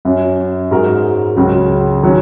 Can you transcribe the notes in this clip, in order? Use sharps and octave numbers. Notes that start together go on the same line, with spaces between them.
F#2 F#3 C#4
G#2 G#3 F#4 A#4
C#2 C#3 F#3
D#3 F#3 C#4